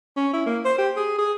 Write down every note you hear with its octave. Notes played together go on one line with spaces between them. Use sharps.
C#4
E4
A#3
C5
G4
G#4
G#4